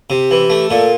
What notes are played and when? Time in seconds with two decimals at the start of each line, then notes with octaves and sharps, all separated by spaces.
0.10 C3 G4
0.31 E3
0.50 A3
0.70 A#2 A4